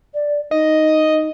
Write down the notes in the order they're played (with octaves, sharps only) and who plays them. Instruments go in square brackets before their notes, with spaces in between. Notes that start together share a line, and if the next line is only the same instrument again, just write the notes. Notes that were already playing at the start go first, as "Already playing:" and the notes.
[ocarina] D5
[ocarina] D#4 [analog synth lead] D#5